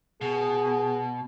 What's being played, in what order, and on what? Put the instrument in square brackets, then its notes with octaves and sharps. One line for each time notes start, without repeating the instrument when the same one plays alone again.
[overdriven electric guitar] B2 [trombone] G#4